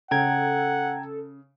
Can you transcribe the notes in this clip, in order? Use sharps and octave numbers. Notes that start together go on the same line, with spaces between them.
C#3 A4 F#5 G5 A#5 G#6